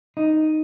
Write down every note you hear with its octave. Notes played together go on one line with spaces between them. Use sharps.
D#4